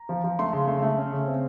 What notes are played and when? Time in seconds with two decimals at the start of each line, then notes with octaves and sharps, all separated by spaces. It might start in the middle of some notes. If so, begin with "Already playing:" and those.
Already playing: A#5
0.09 F3
0.24 F3
0.39 A3 C6
0.53 C#3
0.67 A3
0.82 A3
0.97 C#4
1.12 C#3
1.28 C4